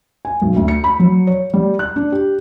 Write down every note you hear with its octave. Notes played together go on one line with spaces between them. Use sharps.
G#5
B1
D2
C#7
B5
F#3
C#5
G3
F#6
D4
G4